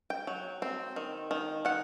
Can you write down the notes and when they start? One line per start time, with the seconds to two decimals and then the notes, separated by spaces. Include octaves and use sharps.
0.10 G5
0.27 F#3
0.62 C4
0.96 D#3
1.31 D#3
1.65 D#3 F#5